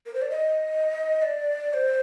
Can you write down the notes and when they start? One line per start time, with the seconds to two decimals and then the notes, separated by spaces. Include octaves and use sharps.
0.06 A#4
0.14 C5
0.22 D5
0.30 D#5
1.22 D5
1.69 D5
1.74 C5